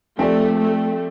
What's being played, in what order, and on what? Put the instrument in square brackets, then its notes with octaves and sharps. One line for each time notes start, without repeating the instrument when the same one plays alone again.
[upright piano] F3 C4 G4 D5 [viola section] A3
[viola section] A3